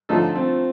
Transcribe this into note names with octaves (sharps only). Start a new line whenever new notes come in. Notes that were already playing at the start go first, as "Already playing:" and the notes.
D3 F3 A3 D#4 F4 A4
C4